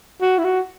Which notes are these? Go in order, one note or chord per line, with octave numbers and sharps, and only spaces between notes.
F#4
E4
F#4